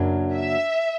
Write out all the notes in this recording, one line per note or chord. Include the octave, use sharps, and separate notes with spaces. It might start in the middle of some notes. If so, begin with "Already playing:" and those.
Already playing: F#2 C#3 F#3 A#3 D4
E5